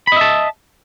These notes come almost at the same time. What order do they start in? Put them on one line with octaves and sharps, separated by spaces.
B5 D#5 E5 A5